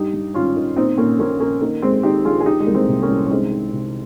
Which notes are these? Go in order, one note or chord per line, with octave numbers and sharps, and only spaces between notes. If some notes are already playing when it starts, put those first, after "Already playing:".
Already playing: G2 D#4 G4
G2
G#1 C#4 F4
D#3
A#2 C4 D#4
A#2 A#3 C#4
A#1 A#3 C#4
A#2 A#3 C#4
D#3 A#3
G#2 G#3 C4
D#3 D#4 G4
A#1 F4 G#4
G#4
D#3 D#4 G4
G#3
C2 A#3
G#3 C4
C3
A#3 C#4
C2
C#4
D#3 G#3 C4
D#3
C3